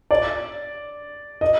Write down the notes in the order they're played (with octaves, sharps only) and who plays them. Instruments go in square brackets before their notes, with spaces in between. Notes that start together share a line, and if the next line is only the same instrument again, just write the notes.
[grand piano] D5
D#5